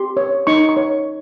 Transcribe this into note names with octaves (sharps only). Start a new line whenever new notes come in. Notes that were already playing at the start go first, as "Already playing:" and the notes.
Already playing: G4 C6
C#5
D#4 C#6
C#6
C#5